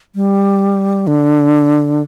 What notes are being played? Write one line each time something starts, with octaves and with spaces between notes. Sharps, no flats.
G3
D3